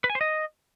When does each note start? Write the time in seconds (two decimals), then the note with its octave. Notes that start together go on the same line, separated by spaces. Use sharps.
0.04 B4
0.10 G#5
0.15 C5
0.21 D#5